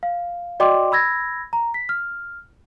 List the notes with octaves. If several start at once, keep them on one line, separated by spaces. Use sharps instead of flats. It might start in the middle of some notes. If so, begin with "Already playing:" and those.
F5
F#4 D5 D#5 G5 C6 D6
B5 E6 G#6 A#6
A#5
B6
F6